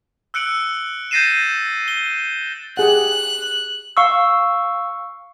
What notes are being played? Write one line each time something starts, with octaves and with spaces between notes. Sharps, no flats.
E6 F#6 C#7 D7 F#7
G6 A6 A#6 C7 D#7 E7
G7
G4 G#4 F#5 F#6
F5 C#6 E6